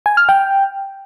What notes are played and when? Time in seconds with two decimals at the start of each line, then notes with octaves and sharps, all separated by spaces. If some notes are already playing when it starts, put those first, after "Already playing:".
0.06 G#5
0.17 F6
0.29 G5